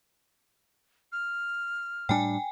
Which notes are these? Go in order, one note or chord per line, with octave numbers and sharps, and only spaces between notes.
F6
A2 G3 D4 G5 G#5